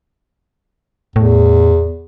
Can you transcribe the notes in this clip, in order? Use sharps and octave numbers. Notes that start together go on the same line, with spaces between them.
E2 A2